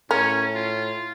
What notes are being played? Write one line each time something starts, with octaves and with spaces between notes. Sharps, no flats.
A2 C#4 A#4
F4